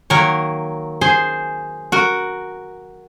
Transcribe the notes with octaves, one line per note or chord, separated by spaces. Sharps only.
D#3 F#3 A#3 A#4 C#5
G#4 C5
F#4 A#4